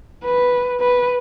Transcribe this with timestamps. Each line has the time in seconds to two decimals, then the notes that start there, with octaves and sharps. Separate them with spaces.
0.24 B4
0.80 B4